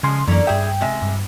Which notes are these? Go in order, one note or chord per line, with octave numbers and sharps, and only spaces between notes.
C#3 F3 G#3 C6
F#2 D3 E3 A#3
G2 G#4 E5 G5
C3 G#3 E5
G2